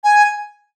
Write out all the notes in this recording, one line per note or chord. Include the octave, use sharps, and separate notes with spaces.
G#5